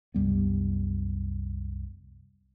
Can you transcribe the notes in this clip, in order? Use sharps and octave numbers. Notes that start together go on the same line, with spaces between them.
C2 F#2 G3 B3